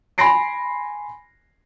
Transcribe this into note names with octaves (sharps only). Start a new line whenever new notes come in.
G#5 B5 C6 A#6 C7 D7